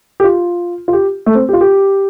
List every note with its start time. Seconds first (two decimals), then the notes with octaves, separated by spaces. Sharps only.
0.20 G4
0.24 F4
0.88 F4
0.93 G4
1.26 A3
1.35 C4
1.49 G4
1.53 F4
1.61 G4